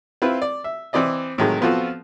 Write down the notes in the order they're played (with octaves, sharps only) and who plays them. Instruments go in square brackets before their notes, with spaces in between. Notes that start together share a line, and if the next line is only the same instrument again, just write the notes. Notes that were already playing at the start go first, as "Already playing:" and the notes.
[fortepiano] C4 E4 F4 B4
D5
E5
E3 C4 E4 D5 D#5
A2 C3 D#3 F#3 G#3
F3 B3 C4 F4 F#4 A4